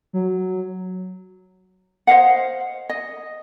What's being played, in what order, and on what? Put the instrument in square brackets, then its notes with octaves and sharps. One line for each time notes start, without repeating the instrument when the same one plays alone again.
[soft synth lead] F#3
[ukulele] C5 D#5 F5 F#5
D#5